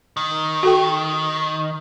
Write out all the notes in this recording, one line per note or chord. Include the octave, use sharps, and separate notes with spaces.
D#3
F#4 A4 G5